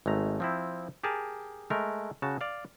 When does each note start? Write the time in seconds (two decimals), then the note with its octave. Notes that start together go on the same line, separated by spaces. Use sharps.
0.06 G#1 G#3 A3 A#5
0.40 F3 C4 E4
1.03 G4 G#4 A#4 A5
1.70 G#3 A3 A#4
2.22 C#3 F#4 A5
2.41 D5 F5